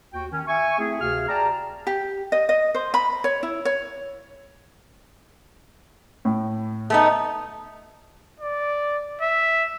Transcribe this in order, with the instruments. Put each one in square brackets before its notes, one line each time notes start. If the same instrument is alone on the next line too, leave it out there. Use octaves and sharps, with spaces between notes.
[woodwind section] D#2 F#4 G5
D#3 C#4
E5 G#5 C#6
A3 C4 E4 G#4
D2 C3 F#4 G#4 F5 F6
G#4 D5 G5 A5 A#5
[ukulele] G4
D#5
D#5
C5
B5
C#5
E4
C#5
[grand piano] A2
[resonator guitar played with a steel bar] A3 B3 D#4
[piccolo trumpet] D5
E5